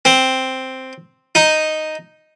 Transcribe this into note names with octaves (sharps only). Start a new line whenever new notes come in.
C4
D#4